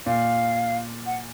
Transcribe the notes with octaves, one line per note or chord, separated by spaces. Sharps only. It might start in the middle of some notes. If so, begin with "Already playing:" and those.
A#2 F5
F#5